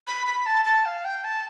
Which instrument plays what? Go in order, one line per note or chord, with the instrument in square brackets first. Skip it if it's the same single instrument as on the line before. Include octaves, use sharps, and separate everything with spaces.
[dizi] B5
B5
A5
A5
F5
G5
A5